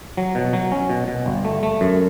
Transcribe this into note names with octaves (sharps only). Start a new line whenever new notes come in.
F#3
B2
F#3
C#4
B2
B2
G1
A3
A3
F#2